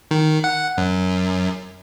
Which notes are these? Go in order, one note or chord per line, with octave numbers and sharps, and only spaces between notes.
D#3
F#5
F#2